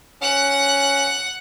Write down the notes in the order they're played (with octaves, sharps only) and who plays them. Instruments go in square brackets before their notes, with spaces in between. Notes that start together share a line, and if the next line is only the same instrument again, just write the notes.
[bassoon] C#4 [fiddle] F#5 F#6